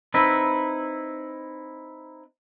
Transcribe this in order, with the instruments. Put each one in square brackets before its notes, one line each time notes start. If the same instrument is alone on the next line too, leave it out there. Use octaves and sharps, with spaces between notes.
[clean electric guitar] C4 D#4 E4 B4